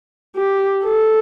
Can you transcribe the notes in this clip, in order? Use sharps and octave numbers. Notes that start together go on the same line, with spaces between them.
G4
A4